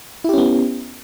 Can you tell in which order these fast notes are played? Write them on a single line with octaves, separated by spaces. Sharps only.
E4 G4 C#4 B3